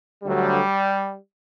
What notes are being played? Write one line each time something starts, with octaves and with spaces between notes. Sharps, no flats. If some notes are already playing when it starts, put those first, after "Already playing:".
D2 D3 F#3 G3